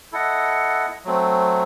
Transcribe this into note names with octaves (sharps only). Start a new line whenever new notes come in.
E4 A4 D#5 F#5
F#3 A3 C4